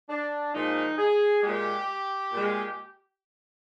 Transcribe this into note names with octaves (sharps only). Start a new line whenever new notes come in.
D4
A#2 F3 G#3 D#4
G#4
A#2 G#3 G4
A#2 G#3